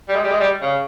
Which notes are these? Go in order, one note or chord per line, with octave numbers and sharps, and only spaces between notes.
G3
G#3
G3
G#3
G3
C#3